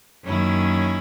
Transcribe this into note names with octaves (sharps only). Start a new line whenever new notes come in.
F#2 D#3 A#3 C#4 E4